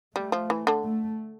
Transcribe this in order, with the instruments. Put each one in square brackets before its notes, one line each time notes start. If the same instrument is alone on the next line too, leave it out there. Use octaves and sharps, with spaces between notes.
[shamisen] G3 [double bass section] A3
[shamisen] F3
E3
D3
[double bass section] A3